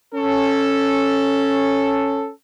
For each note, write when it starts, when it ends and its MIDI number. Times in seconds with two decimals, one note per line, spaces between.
0.14 2.30 61
0.14 2.30 69